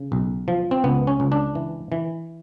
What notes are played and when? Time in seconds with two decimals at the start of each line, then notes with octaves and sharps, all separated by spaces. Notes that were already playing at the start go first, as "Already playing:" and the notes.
Already playing: C#3
0.12 B1
0.48 F3
0.71 C4
0.84 C#2 B3
1.07 C#4
1.20 C#2
1.32 D4
1.55 E3
1.92 E3